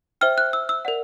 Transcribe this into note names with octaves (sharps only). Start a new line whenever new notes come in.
C5 E5 G5 F6
F#6
E6
E6
A#4 D5 F#5